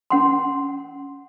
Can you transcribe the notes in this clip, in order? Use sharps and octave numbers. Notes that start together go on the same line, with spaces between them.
C#4 F#5 C6